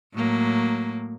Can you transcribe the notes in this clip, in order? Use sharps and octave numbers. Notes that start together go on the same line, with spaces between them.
A2 F#3 A#3